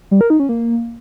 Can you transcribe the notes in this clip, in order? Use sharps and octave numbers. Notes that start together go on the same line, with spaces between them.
G3
A#4
D#4
C#4
A#3